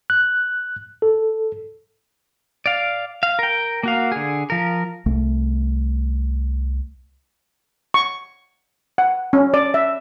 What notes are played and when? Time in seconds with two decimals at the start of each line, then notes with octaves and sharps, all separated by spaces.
0.10 F#6
1.02 A4
2.66 D5 F5
3.23 F5
3.39 A#4 G5
3.83 A#3 F#4 F5
4.12 D3 G#4
4.50 F3 A#4
5.06 C2 A3
7.94 C#6
8.98 F#5
9.33 C#4
9.54 D5
9.74 E5